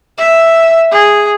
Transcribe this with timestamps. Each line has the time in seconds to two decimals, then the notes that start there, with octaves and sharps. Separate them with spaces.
0.18 E5
0.91 G#4